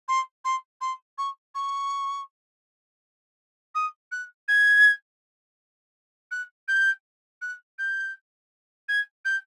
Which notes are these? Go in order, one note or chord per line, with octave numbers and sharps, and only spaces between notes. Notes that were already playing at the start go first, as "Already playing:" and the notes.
C6
C6
C6
C#6
C#6
D#6
F#6
G#6
F#6
G6
F#6
G6
G#6
G6